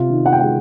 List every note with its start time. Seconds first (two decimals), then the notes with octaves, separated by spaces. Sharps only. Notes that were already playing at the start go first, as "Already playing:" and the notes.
Already playing: C3 F4
0.10 D#3
0.26 F#5
0.33 G5
0.39 G#3 F#5